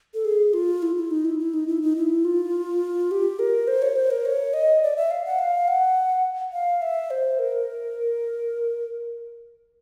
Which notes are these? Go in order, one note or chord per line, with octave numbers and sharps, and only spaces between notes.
A4
G#4
F4
E4
E4
D#4
E4
E4
D#4
E4
D#4
E4
F4
G4
A#4
C5
C#5
C5
A#4
C#5
D#5
D5
E5
F5
F#5
F5
F#5
F5
E5
C5
A#4